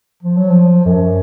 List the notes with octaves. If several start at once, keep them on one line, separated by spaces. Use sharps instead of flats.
F3
F#3
F3
F#2